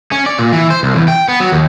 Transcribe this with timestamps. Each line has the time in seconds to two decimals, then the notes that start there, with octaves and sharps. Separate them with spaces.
0.12 C#4
0.26 D5
0.39 A#2
0.53 E3
0.70 C5
0.83 C2
0.95 E2
1.08 G5
1.28 B3
1.40 F#3
1.52 D#2